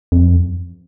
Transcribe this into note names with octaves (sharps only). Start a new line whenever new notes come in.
F2